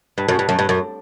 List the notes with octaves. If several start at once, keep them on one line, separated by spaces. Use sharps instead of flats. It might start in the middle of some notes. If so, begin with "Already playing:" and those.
G2
F#2
G2
F#2
G2
F#2